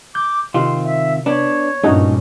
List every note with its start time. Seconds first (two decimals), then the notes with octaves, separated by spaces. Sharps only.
0.15 D6 G6
0.54 C3 D#3 C4 F4 C6
0.85 E5
1.26 B3 D4 C#5
1.84 G2 A#2 A3 C#4 D#4 F#4